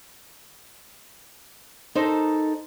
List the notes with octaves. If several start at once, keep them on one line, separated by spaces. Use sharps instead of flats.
D#4 A4 A#4 C5